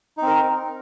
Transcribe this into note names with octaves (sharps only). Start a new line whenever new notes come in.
C4 D#4 A#4